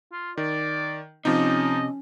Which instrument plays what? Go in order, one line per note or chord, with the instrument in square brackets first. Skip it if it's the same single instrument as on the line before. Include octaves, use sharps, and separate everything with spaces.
[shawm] F4
[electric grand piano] D#3 [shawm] D5
[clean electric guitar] C3 [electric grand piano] F3 D#4 [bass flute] C#4 [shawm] D#5